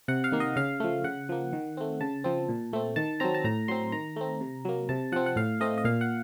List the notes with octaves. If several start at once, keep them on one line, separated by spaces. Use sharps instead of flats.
C3 F#5
F5
D#3 A#3
D#5
C#3 F5
F3 A3
C#3 F#5
F3 A#3
D#3
A3 C4
C#3 A5
F3 C4
A#2
A3 C4
D#3 A5
F#3 C4 A#5
A5
A2 A#5
F#3 C4 C6
D#3 A#5
A3 C4
C3
F#3 A#3
C3 A5
F3 C4 F#5
F#5
A2 F5
A3 C4 D#5
D#5
A#2 F5
F#5